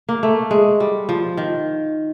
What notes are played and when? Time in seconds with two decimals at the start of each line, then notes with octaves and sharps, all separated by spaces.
0.09 A#3
0.23 A3
0.51 G#3
0.80 G3
1.09 F3
1.37 D#3